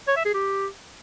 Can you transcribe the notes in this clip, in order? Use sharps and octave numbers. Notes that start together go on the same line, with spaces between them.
C#5
E5
G#4
G4